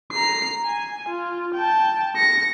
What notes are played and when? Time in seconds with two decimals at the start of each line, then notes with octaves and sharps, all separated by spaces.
0.12 A#5 C7
0.66 G#5
1.09 F4
1.55 G5 A5
2.17 A#6 C#7